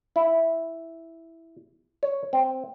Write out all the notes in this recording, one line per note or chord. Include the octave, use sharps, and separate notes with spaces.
E4
C#5
C4